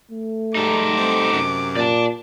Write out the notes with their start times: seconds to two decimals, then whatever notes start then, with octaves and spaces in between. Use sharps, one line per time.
0.11 A3
0.55 G#2 G3 D#4 A4 D6
0.97 G3 C4
1.32 F#2 C3
1.76 A#2 D5 A5